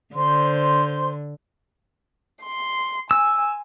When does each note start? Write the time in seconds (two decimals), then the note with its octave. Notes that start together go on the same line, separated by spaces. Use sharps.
0.15 D3 C5 C6
2.44 C6
3.11 G#5 E6